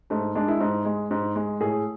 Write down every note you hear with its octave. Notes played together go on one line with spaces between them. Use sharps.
G#2 A3
G#3 D4
E4
G#2
G#3
G#2
G#3
A2 G#4